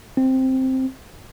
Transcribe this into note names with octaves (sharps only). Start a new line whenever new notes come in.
C4